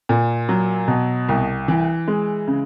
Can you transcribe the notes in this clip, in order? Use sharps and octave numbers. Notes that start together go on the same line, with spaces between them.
A#2
F#3
B2
C2
E3
G#3
C#3